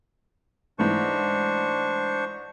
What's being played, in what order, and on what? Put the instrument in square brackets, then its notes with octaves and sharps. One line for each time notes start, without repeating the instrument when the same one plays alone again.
[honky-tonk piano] G#2 E3 A3 [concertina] D4 C5 C#6